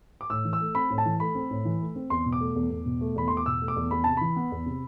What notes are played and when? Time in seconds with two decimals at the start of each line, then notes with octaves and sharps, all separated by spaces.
0.21 D6
0.30 A2 E6
0.45 E3
0.53 E6
0.60 A3
0.75 C4 B5
0.90 A2
0.98 A5
1.06 E3
1.20 A3 B5
1.35 C4
1.50 A2
1.65 E3
1.81 A3
1.96 C4
2.10 E2 C6
2.26 B2
2.32 D6
2.40 A3
2.56 E2
2.70 E2
2.86 B2
3.01 A3
3.16 E2 B5
3.28 E2 C6
3.37 D6
3.46 B2 E6
3.61 A3
3.68 D6
3.76 E2
3.91 E2 B5
4.04 C3 A5
4.17 E3 B5
4.36 B3
4.52 E2
4.66 C3